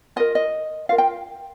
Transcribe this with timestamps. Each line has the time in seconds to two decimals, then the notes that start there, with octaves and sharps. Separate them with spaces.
0.16 F4 A#4 D#5
0.35 D#5
0.89 F4 A#4 F5
0.98 G5